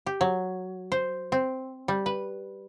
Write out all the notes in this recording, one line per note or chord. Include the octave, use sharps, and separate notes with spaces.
G4
F#3
C5
C4
G3
B4